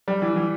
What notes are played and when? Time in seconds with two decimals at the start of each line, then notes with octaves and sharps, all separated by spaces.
0.08 G3
0.22 E3
0.36 E3